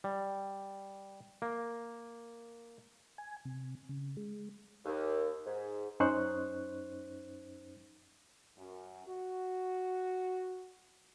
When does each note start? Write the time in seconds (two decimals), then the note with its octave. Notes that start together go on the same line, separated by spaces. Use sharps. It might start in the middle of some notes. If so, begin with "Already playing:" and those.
0.04 G3
1.42 A#3
3.18 G#5
3.45 C3
3.89 C#3
4.17 G#3
4.85 D#2
5.46 G#2
6.00 F#2 C#4 D#4 C5 C#6 F#6
8.56 F#2
9.07 F#4